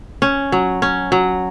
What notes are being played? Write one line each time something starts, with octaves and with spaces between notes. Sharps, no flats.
C#4
F#3
C#4
F#3